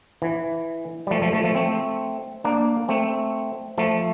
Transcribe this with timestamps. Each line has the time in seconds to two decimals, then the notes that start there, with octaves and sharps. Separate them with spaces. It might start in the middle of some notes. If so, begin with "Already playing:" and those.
0.22 E3
1.07 G3
1.11 F3 A3
1.22 F3 A3
1.33 F3 A3
1.44 F3 A3
1.55 A3 C4
2.44 A#3 D4
2.89 A3 C4
3.78 F3 A3